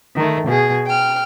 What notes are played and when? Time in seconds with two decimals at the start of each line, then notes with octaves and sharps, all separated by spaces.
0.16 D#3 A3
0.48 B2 G#4
0.86 G5 F6